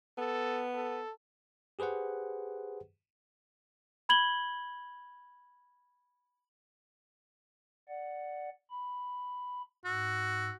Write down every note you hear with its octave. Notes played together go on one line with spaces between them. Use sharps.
B3 A4
A4
G4 G#4 B4 C5 F#5
B5 G#6 F#7 G7
D5 F#5
B5
G#2 F#4 E6